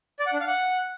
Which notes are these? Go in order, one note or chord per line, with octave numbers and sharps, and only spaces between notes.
D5
F#5
D4
F5
F#5